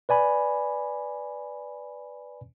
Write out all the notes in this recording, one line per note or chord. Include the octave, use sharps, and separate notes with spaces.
B4 D5 G#5 B5